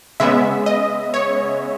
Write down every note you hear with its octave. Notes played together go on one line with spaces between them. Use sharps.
C#3 G#3 B3 E5
D#5
C#5